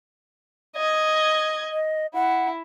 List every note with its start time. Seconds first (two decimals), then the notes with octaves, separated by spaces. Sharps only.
0.76 D#5 G#6
1.71 D#5
2.14 E4 F#5